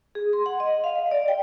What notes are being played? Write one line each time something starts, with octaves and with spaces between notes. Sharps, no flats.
G#4
C6
F#5
D#5
F5
D#5
D5
G5